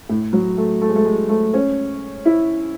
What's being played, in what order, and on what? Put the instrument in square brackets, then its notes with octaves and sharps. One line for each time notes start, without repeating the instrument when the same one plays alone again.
[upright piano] A2
F#3
A3
A3
G#3
A3
G#3
A3
C#4
E4